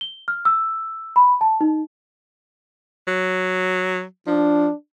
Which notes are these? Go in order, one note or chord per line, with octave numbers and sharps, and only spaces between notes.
G7
F6
E6
B5
A5
D#4
F#3
F3 D4